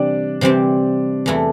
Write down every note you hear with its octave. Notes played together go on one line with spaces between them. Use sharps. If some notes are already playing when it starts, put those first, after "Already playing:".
Already playing: C3 E3 G3 C4 D4 G4 D5
C3 E3 G3 C4 G4
E2 E3 A3 E4